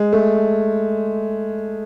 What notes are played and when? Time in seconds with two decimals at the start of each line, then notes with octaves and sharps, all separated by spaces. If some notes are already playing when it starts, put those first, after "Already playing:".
Already playing: G#3
0.13 A3